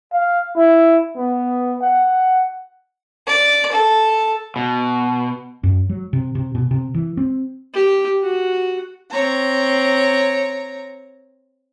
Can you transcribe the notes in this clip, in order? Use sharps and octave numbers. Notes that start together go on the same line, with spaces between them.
F5
E4
B3
F#5
D5
A4
B2
F#2
F#3
C3
C3
B2
C3
E3
C4
G4
F#4
C4 C#5 A#5